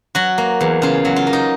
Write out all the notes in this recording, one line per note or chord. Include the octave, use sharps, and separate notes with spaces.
F#3 F#4
A#3
E2
C#3 F4
F#3
F4
A#3
D#4